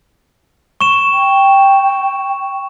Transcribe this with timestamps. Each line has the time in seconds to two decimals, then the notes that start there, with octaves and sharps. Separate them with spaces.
0.81 C#6 E7
1.12 G5